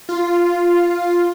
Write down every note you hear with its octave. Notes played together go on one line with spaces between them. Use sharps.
F4